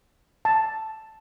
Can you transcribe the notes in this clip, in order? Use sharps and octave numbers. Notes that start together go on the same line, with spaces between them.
A5